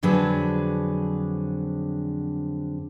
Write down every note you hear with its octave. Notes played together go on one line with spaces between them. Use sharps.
F2 D3 F#3 D4 G#4 B4